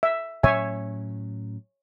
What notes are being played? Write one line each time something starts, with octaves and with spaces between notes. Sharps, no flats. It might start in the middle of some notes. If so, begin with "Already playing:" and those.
E5
A2 F#3 C#4 C#5 E5 G#5